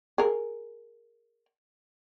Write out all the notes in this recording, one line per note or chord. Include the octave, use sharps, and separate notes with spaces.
G#4 A#4